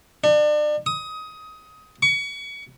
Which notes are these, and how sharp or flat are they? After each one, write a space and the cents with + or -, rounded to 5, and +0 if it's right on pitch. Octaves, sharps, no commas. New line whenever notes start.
D4 +35
D#6 +20
C#6 +30